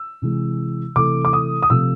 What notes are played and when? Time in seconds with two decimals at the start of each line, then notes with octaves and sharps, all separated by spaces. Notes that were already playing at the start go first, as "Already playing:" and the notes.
Already playing: E6
0.22 C3 E3 G#3
0.96 C3 E3 A3 D6
1.25 D6
1.33 D#6
1.62 D#6
1.70 C3 F3 A3 E6